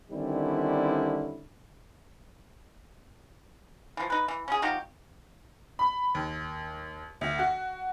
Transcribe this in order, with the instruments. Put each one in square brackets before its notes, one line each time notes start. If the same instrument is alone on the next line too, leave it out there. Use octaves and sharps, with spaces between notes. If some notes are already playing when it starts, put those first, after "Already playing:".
[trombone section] D3 D#3 G3 C4 C#4 E4
[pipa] E3 F3
D#4 B4
E3
C#4 G#4
F3 D#4 F#4 G4
[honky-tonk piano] B5
D#2
D2
F#4